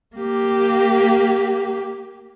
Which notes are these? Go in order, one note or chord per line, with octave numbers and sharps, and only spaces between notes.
A#3 G4